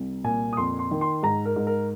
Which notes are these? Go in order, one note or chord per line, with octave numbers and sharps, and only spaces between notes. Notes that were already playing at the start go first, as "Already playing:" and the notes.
Already playing: C2
A#2 G#5
D#6
F2 C6
C6
D#3
C6
G#2 A#5
A#4
G#2
A#4